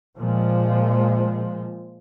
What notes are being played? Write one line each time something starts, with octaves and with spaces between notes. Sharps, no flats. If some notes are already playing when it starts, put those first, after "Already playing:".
A#2 F3 G#3